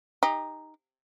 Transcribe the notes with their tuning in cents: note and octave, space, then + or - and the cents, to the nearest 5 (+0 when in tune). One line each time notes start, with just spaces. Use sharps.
D#4 +0 G4 +35